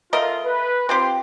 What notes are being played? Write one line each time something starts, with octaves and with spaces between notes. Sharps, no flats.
A3 F4 A#4 D#5
B4
C4 F4 G4 C6